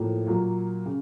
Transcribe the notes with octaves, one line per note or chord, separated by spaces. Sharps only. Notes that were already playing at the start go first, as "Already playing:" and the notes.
Already playing: A2 F3 A#3
A#2 F#3 A#3
C#3